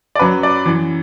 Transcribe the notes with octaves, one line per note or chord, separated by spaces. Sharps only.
D5
F#2 F#3 B4
D5
F#2 E3